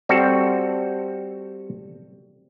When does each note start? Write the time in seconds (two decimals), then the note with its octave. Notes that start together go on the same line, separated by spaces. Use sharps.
0.09 G3 C4 F#4 A4